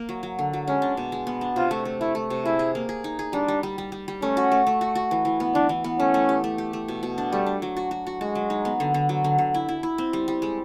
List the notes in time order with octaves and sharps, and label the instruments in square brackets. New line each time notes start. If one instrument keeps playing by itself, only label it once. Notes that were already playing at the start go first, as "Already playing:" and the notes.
Already playing: [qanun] A#3
F#3
F#3
D3
F#3
[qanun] G#3 [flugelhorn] C#4
[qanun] D4
B2
G#3
B3
D4
[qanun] C3 [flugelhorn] F4
[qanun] A3
A3
[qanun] A3 [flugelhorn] E4
[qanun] A3
C3
[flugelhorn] E4 [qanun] G#4
[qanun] G#4
A#3
G#4
D#4
G#4
[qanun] G3 [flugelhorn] D4
[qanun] G3
G3
G3
G3
G3
[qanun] A3 [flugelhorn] C#4
[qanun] F#4
A3
A3
F#4
F#4
E3
E3
B3
[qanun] E3 [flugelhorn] D4
[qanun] E3
B3
[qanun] A3 [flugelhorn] C#4
[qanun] A3
G4
A3
G4
A3
B2
B2
D4
[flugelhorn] G3 [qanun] A3
[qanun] D4
F#3
F#4
F#4
F#4
[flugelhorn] G#3 [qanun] F#4
[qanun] F#3
D#4
B3
D3
D3
F#3
D3
D3
E4
E4
E4
C4
G3
G3
G#3